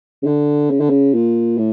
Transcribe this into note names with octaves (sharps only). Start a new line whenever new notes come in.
C#3
D3
C#3
D3
C#3
A#2
A2